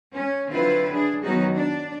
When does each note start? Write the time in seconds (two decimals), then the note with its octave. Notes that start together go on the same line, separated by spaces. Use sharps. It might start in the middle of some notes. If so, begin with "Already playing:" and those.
0.14 C#4
0.50 D3 F#3 C4 E4 F4 B4
0.92 D4 G#4
1.23 D#3 F#3 B3 C#4 D#4 F#4
1.55 D4 D5